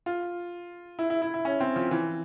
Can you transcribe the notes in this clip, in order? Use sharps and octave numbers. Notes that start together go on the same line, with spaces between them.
F4
E4
E4
E4
E4
C#4
C4
F3
E3